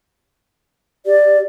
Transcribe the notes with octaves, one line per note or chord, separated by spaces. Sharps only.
G4 D5